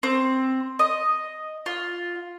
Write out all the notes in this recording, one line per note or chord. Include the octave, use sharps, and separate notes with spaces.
C4
D#5
F4